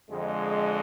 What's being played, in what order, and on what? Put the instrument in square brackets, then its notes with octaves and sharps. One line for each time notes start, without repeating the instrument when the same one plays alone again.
[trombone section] F2 D3 G#3